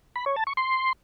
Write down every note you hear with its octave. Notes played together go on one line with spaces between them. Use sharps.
B5
C#5
A5
C#6
C6